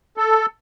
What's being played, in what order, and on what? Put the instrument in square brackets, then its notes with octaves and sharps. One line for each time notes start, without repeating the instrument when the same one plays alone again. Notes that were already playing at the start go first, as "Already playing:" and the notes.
[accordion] A4